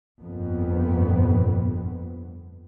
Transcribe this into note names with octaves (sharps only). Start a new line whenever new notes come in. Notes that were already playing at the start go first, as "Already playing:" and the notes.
G1 F2 A#2 B3